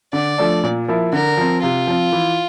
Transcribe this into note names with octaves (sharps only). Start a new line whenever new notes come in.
D3 D5
F3 A3 D4
A#2
F3 A#3 E4
D3 A#4
F3 C4
C3 F4
F3 C4
E3